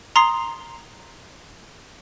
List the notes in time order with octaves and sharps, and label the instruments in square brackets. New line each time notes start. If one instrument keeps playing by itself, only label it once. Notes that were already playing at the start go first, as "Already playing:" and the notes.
[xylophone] A#5 C6 D#6 C7